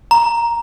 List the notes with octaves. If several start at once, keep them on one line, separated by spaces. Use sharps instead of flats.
A#5